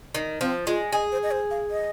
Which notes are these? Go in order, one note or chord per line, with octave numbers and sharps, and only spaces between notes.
D#3
F3 C4
G#3 F4
G#4 D#5
C5
D#5
C5
F5
D#5